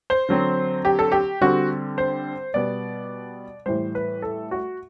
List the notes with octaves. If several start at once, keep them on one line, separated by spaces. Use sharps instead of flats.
C5
D3 F#3 C4
G4
A4
G4
D3 G3 C4 F#4
C5
B2 G3 B3 D5
A2 E3 G3 C5
B4
A4
F#4